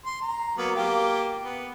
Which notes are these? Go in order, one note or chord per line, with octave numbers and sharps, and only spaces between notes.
C6
A#5
F#3 A#3 B3
A#3 F4 G4
B3